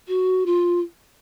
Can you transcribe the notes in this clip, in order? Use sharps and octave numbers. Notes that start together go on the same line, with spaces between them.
F#4
F4